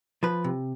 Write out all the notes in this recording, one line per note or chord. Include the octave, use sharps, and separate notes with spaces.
F3 B4
C3